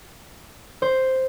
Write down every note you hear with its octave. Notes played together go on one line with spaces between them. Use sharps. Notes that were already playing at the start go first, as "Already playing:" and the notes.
C5